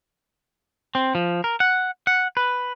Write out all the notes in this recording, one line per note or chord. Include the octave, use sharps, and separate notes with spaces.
C4
F3
A#4
F#5
F#5
B4